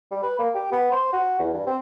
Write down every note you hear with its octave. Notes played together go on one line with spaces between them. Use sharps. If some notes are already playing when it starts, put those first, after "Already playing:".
G3
B4
A#3
G4
B3
C5
F#4
E2
G2
C4